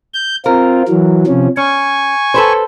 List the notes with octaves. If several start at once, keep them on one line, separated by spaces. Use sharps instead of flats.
G6
C4 F4 A#4
E3 F#3
C3 F3 C#4
C#4 G#5 C#6
A4 B4 C5